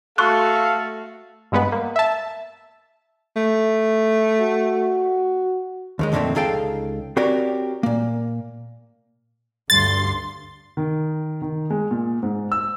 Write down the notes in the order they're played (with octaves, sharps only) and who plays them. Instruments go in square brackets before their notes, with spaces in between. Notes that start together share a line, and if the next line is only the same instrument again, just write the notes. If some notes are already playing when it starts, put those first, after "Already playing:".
[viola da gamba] A3 F#4 [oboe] A4 [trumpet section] F5 [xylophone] C6 C#6 F#6
[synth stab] G2 G#3 B3 B4
A#3
E5 A5
[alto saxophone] A3
[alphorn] F#4
[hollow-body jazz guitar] D#2 D#3 G#3
F2 A#2 D3 D#3 A3 C4
C#2 D#4 G#4 A4 F5 G5
C4 F#4 G4 A#4 C#5 D5
A#2 A#3
[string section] D2 G2 C6 [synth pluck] A6
[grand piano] D#3
D#3
G#3
A#2
G#2
E6